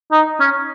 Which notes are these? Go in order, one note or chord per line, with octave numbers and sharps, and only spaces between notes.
D#4
C#4